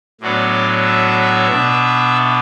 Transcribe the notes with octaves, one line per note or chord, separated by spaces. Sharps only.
A2 F#3 B3 D4 D5
E5
B2 B3 D4